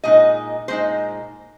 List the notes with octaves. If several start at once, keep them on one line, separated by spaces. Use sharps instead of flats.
A#2 G#3 D#4 D#5
A#2 G#3 D#4 C5